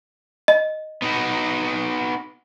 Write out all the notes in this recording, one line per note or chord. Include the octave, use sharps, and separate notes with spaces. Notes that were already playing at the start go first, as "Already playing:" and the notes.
D#5
B3 D#4 F#4